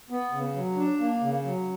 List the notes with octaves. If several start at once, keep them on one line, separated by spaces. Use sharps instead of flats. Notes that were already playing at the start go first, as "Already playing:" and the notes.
B3
C#3
F#3
D4
A#3
C#3
F#3